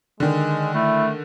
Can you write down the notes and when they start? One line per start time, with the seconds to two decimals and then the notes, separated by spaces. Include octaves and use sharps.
0.20 D3 D#3 G#3
0.74 A3 E4